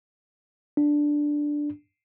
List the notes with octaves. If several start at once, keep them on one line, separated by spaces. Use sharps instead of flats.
D4